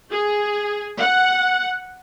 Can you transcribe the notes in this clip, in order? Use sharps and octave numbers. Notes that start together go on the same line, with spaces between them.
G#4
F#5